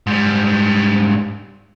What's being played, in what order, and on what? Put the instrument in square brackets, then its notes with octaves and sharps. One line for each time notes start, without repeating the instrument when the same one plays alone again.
[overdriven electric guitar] G#2 G3